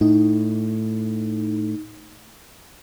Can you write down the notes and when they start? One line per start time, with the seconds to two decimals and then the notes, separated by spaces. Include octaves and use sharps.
0.01 A2 D#4